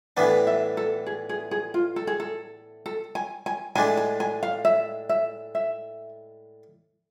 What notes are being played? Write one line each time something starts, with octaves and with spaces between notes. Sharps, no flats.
A2 E3 B3 D4 G#5
E5
A4
G#4
G#4
G#4
F4
A4
G#4
A4
A4
G#5
G#5
A2 G#3 D4 G#5
G#5
G#5
F5
E5
E5
E5